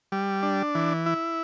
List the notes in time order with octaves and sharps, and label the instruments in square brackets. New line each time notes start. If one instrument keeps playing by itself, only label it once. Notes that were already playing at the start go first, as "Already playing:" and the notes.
[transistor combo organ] G3
D4
E3
E4